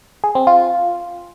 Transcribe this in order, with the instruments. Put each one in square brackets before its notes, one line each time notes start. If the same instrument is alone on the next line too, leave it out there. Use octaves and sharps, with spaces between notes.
[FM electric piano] G#4
C4
F4